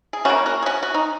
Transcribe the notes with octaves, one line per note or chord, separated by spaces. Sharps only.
G#4
C#3 A#3 C#4 F#4
F#4 A#4
G#4
C#4 F#4
F#4
D#4